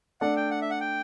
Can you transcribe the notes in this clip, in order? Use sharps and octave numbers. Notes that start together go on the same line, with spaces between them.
A3 D4 A4 D5 F#5
G5
F#5
E5
F#5
G5